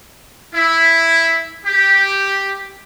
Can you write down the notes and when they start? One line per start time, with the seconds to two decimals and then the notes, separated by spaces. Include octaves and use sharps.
0.54 E4
1.65 G4